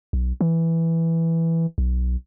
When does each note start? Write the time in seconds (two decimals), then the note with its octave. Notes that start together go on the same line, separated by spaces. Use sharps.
0.13 B1
0.41 E3
1.78 B1